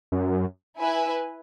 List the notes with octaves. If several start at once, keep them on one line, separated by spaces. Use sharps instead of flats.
F#2
E4 B4 E5 G#5